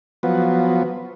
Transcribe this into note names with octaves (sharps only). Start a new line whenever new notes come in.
F3 F#3 B3